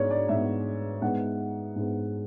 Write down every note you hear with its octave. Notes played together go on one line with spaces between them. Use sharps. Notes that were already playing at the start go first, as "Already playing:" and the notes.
Already playing: G#2 G#3 B3 C#5 D5
D5
G#2 G#3 B3 E5
G#2 G#3 B3 F#5
G#2 G#3 B3